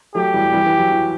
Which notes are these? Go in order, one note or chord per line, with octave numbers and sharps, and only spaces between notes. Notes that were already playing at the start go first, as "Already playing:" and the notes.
F#3 A3 G4
E3 G3
E3 G3
E3
F#3
E3